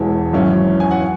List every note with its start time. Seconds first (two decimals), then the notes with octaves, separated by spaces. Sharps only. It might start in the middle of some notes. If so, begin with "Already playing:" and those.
Already playing: E1 E2 E3 G#3 C#5
0.33 G#1 F#2 E3 C#4
0.80 G#5
0.91 F#5